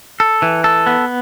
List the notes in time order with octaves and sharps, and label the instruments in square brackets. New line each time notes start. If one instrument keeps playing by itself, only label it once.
[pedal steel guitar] A4
E3
A4
B3